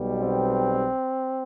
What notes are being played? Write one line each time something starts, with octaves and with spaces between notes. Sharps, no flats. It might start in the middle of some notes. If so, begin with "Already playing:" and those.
Already playing: B1 B2 G3
C4